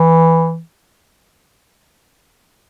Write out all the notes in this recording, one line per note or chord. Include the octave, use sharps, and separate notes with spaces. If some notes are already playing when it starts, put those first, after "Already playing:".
Already playing: E3